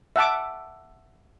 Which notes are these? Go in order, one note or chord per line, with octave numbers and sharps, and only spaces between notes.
E5 F#5 A5 D6